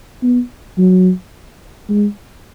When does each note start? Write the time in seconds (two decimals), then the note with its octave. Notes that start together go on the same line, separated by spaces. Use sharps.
0.23 B3
0.78 F#3
1.89 G#3